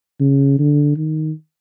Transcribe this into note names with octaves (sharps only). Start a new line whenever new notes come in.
C#3
D3
D#3